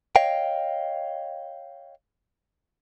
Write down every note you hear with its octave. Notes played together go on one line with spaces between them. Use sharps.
C#5 D#5 F5 G5